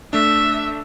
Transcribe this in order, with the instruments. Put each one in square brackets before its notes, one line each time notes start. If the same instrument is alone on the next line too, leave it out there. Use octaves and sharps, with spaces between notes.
[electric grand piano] A3 D4 [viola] E5